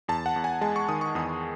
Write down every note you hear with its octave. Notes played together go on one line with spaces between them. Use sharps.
E2 A5
F#5
E2
G#5
G#3 A5
C#6
D#3 D#6
C#6
E2 D#6